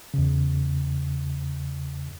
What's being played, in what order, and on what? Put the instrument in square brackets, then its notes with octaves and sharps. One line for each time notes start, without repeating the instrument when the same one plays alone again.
[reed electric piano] E2 C#3